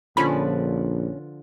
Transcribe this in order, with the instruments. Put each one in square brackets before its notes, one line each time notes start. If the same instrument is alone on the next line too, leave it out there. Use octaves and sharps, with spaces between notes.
[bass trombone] A#1 [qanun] D3 F3 B4 [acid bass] C#4 [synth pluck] B5